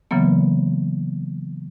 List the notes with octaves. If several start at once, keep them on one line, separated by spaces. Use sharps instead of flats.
C#3 E3 F#3 A#3 B3